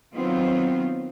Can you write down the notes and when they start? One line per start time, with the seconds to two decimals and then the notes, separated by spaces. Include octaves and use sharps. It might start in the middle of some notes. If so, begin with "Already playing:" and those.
0.14 D#3 F#3 B3 C4 F4